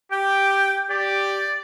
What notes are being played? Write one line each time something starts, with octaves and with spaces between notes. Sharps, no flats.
G4 G5
G4 D5